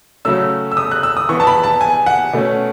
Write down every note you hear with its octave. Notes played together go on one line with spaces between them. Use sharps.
C#3 F#3 A3 C#4 E6
E6
D#6
F#6
E6
D#6
E3 B3 C#6
A5
B5
A5
G#5
F#5
B2 A3 C#4